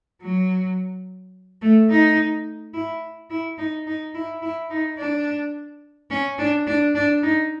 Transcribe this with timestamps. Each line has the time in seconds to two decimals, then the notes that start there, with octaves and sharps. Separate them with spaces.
0.22 F#3
1.62 A3
1.90 D#4
2.73 E4
3.30 E4
3.58 D#4
3.86 D#4
4.14 E4
4.42 E4
4.70 D#4
4.98 D4
6.10 C#4
6.38 D4
6.67 D4
6.95 D4
7.23 D#4